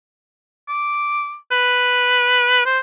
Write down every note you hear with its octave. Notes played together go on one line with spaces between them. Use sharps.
D6
B4
C5